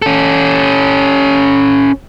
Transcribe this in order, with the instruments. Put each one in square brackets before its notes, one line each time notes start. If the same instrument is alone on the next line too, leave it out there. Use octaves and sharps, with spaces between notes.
[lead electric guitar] C#4 A4